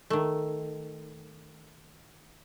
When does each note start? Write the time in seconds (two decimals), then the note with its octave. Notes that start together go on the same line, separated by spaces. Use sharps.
0.10 D#3 A3